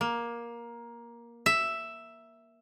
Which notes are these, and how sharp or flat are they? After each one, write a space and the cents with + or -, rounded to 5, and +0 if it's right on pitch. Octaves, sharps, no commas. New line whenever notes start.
A#3 +15
E5 +5